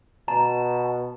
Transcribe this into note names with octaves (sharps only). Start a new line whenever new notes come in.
B2 A5 A#5